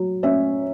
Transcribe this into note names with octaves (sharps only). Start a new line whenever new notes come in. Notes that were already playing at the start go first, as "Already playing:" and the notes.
Already playing: F#3
C#4 E5